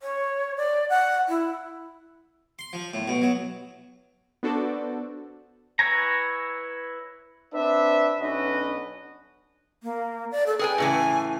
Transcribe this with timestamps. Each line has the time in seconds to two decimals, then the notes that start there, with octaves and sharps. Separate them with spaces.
0.01 C#5
0.56 D5
0.90 F#5
1.29 E4
2.59 C6
2.73 F3
2.94 A2
3.08 B2
3.22 F#3
4.43 B3 D4 F#4 A4 C5 D5
5.79 E4 B4 C#5 G#5 A#5
7.54 C4 D4 B4 E5
8.20 B1 C#4 D4 F#4 B4 D#5
9.83 A#3
10.31 D5
10.47 A4
10.59 G#4 B4 G5 G#5
10.78 A2 C#3 E3 G#5